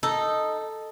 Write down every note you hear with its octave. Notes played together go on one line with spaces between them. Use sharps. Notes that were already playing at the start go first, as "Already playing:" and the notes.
D#4 A4